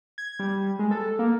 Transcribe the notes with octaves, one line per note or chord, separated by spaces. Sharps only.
G#6
G3
G#3
A4
A#3